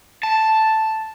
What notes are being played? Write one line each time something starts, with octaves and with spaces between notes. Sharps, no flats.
A5